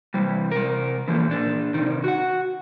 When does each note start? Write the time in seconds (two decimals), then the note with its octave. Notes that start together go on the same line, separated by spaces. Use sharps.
0.14 C3 E3 G3
0.51 C3 A#4
1.08 D3 E3 F3 A#3
1.28 A#2 D4
1.74 C3 D#3
2.04 F#4 F#5